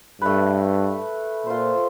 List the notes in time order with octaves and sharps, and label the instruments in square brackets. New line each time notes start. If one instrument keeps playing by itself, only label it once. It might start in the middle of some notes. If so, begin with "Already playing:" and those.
[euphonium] G2 [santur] A3 B4
[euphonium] A#2 [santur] F4 C5